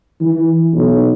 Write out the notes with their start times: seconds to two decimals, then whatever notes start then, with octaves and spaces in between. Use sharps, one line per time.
0.21 E3
0.73 B1